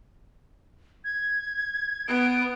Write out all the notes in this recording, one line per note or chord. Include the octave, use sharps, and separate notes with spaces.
G#6
B3 D7